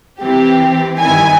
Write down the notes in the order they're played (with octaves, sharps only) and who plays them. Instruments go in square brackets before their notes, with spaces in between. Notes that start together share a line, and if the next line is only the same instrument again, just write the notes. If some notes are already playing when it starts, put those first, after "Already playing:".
[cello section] E3 C4 [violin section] G4
[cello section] G2 D#3 E4 [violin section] G#5